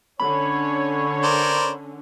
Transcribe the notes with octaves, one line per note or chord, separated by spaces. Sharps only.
D3 C#4 C#5 B5
A#4 C5 D5